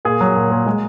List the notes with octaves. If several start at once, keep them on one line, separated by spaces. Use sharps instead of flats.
A#2 G#4
F#3
A#2
A#2
G#3